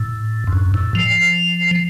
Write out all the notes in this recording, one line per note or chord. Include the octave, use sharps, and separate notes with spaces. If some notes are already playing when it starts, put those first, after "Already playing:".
Already playing: A2
F2
F#2
A2
F3